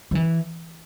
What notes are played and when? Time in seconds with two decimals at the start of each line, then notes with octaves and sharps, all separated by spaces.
0.11 F3
0.15 E3